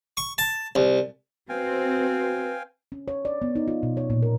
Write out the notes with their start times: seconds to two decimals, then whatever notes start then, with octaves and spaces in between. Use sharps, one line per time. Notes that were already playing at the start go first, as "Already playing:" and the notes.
0.17 C#6
0.38 A5
0.75 C2
1.49 C4 F#4 B4 F5 G5 G#5
2.92 C#4
3.08 C#5
3.25 D5
3.42 B3
3.55 D#4
3.68 F4
3.83 B2
3.97 C#5
4.10 A#2
4.22 A#4